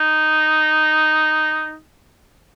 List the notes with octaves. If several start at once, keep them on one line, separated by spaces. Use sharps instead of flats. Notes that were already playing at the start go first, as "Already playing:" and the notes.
Already playing: D#4